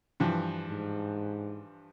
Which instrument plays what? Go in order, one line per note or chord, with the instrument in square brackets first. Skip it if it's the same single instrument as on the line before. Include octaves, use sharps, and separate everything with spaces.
[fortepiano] G2 E3 F3
[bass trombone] G#2